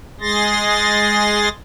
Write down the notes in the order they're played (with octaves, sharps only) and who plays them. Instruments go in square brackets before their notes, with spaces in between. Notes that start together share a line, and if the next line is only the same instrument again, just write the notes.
[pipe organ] G#3 G#4 C6 A6 A#6